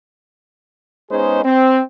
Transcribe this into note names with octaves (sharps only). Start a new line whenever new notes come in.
G#3 B3 C#4 D#4 G#4 C5
C4